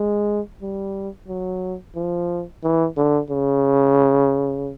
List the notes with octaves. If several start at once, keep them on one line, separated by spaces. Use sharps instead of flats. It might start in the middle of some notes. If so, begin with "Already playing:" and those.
Already playing: G#3
G3
F#3
F3
E3
D3
C#3